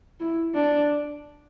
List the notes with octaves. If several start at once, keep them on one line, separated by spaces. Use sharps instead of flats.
E4
D4